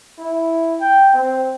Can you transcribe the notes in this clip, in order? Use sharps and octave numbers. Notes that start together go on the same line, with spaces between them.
E4
G5
C4